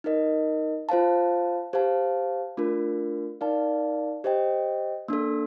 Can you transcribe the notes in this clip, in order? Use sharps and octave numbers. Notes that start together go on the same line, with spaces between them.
D#4 A#4 D#5
F4 C5 F5 A5
G4 C5 F5 A5
A3 D4 F4 A#4
D#4 A#4 D5 F5 A5
G4 C5 D#5 G5
A#3 D4 A4